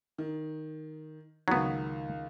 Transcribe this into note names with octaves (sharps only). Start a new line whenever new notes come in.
D#3
C#2 D#3 F#3 B3